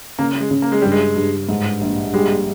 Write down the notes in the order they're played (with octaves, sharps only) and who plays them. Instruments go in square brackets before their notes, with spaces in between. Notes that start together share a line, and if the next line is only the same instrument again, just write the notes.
[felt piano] C#3 [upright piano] A#3
[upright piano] G#3
[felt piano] C#3
[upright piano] A#3
G#3
[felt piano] G2 [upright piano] G3
[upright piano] G#3
[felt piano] G2
G#2
A#1
[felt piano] G3 [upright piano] G#3